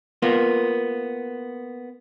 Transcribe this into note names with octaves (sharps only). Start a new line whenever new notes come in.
A#3 B3 F4